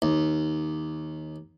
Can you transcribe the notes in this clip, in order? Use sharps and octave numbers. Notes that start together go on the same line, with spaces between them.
D#2